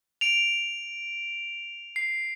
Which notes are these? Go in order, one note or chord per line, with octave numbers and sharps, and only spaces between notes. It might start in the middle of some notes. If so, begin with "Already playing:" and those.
D7 F7
C7